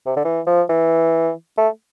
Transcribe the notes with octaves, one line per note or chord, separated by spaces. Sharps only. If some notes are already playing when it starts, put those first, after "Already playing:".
C3
D3
E3
F3
E3
A3